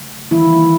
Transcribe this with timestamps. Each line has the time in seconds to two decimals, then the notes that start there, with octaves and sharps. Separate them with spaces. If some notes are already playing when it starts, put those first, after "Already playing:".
Already playing: C#3 F#3 A3
0.31 D#3 E3 G3 A#3 E4